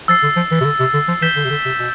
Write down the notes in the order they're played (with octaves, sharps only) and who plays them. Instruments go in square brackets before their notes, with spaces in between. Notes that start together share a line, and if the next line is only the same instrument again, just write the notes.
[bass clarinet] F3 [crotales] E6 A6 C7
[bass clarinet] D3
F3
E3
C3
D3
C3
D3
F3
[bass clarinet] E3 [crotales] G6 B6 E7 G7
[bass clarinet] D3
C3
D3
C3
B2